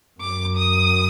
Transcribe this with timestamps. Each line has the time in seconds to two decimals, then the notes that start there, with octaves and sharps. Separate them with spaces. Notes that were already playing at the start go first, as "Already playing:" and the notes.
0.20 F#2 D6
0.56 D#6